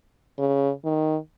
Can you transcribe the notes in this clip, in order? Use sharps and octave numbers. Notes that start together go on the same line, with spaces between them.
C#3
D#3